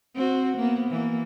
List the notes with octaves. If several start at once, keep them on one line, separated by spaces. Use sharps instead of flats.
C4 F#4
A#3 B3
E3 A#3